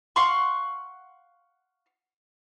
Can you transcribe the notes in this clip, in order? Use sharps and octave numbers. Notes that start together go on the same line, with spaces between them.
F5 F#5 C6 C#6